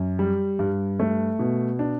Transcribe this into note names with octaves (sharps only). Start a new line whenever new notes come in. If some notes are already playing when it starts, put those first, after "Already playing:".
Already playing: F#2
G3
G2
A3
B2
D4